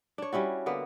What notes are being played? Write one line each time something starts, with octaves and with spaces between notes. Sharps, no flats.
D4 C#5
G3 C#4 E4 F#4
D3 A#3 B3